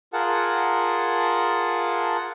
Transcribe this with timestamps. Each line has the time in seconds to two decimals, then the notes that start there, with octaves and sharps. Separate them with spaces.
0.13 F4 G#4 A#4 F#5 A5